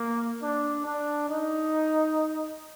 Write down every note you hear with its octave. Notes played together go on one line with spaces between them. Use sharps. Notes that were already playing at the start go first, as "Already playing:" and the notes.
Already playing: A#3
D4
D4
D#4